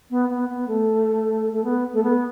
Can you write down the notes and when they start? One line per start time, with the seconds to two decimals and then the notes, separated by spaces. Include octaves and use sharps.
0.09 B3
0.28 B3
0.48 B3
0.67 A3
1.52 A3
1.63 B3
1.92 A3
2.02 B3